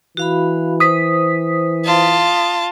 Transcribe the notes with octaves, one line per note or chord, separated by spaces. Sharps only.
E3 F#4 F5 B5
C5 D#6 B6
F4 A5